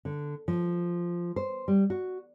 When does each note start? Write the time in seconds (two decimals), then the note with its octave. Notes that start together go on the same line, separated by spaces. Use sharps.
0.05 D3
0.48 F3
1.36 C5
1.68 G3
1.90 F#4